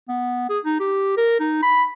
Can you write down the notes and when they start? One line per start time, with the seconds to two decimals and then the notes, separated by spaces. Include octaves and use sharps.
0.08 B3
0.50 G#4
0.65 D#4
0.80 G4
1.17 A#4
1.40 D#4
1.63 B5